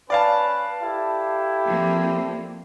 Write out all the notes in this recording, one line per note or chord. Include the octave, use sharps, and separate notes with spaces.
C#4 B4 D5 F5 A5
E4 G4 A4
F3 A#3 C4